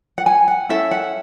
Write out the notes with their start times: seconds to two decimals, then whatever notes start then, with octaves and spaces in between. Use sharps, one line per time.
0.18 F#5
0.26 G#5
0.48 F#5
0.69 C#4 E4 A4 E5
0.91 F#5